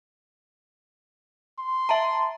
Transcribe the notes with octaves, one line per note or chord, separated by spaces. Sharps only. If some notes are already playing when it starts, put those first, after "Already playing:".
C6
E5 A5 A#5